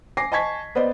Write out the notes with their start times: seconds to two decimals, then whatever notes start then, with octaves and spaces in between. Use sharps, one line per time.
0.17 G#5 D6 A#6 C7
0.32 D#5 G#5 A5 C#6 G#6 B6
0.75 B3 B4 C5 D5 D#5